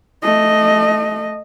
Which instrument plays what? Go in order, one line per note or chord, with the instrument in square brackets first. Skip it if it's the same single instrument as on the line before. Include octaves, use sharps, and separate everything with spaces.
[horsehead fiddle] A3 D#5